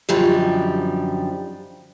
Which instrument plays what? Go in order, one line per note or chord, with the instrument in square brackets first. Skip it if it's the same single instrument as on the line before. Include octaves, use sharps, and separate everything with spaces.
[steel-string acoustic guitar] F#2 D3 F3 G3 D#4 G4